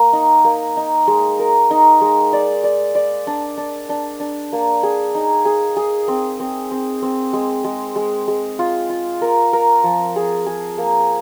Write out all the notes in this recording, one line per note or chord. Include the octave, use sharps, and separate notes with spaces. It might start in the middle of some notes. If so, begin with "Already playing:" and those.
Already playing: A#3
D#4
A#3
D#4
G#3
A#4
D#4
G#3
D5
D5
D5
D4
D4
D4
D4
A#3
G#4
D#4
G#4
G#4
C4
C4
C4
C4
G#3
G#3
G#3
G#3
F4
F4
A#4
A#4
F3
G#4
G#4
A#3